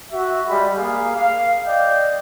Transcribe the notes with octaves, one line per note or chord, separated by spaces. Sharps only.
F#4 E5
G3 G#3 B5
A#3 G#4 F5
F5
D5 D#5 G5